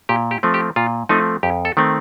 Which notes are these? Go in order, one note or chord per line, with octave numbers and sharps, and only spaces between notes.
A#2 G4
G4
F3 A3 C4
G4
A#2 F4
F3 A3 C4 D#4
F2 G4
A4
D#3 A3 C4